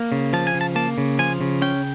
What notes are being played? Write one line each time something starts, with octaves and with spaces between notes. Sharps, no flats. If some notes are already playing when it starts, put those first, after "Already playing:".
Already playing: A#3
C#3
F3 A5
G#5
C#3
A5
A#3 A5
C#3
F3 G#5
C#3
C#4 G5